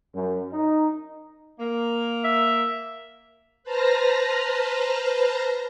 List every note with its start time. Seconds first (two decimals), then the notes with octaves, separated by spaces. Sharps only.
0.15 F#2
0.51 D#4
1.59 A#3
2.24 E5
3.63 B4 C5 A5 A#5 F6 A#6